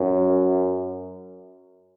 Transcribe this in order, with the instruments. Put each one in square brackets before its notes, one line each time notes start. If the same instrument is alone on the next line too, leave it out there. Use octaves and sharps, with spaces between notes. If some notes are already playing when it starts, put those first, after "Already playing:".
Already playing: [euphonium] F#2